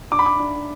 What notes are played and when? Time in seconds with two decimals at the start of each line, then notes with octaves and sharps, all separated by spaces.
0.11 D4 D6
0.19 B5
0.26 D6
0.39 D4